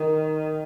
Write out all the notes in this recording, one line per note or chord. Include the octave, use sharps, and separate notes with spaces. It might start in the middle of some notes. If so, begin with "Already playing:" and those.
Already playing: D#3